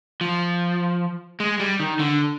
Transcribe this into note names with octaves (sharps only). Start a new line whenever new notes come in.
F3
G#3
G3
D#3
D3